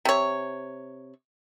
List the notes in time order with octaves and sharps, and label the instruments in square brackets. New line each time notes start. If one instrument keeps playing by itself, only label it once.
[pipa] C3 C#5